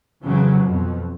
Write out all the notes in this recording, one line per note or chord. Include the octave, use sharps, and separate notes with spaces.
F2 C#3 E3 F#3
F2 B2